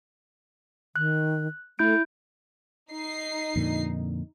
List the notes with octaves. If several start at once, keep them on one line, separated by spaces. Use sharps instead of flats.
D#3 F#6
A3 E4 G6 D7
D#4 C7
F2 A#2 D3